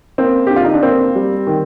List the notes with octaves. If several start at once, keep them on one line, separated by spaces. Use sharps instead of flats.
A#3 C4
D3 G4
F4
D#4
D4
A#3 C4
G3
D#3